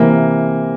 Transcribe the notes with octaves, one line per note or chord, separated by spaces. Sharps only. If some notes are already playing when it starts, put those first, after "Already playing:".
Already playing: C3 E3 A#3